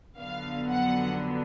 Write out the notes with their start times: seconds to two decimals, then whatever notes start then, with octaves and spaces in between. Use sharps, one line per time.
0.18 F2 D3 F#3 B3 F5
0.70 F#5